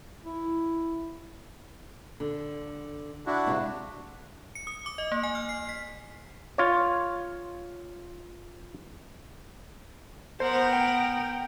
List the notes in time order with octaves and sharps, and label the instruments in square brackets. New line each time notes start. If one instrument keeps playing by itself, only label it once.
[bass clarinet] E4
[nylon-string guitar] D3
[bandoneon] D4 E4 F#4
[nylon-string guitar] G2 C3 G#3
[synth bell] C#7
D#6
D6
D#5
A#3
G#5
F6
C7
B6
[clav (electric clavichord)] F4 C#5
[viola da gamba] B3 A#4 [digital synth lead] C5
[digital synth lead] G5